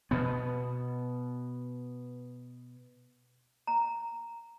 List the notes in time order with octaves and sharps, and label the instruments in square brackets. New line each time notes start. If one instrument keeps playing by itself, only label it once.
[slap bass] B2 B3
[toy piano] A#5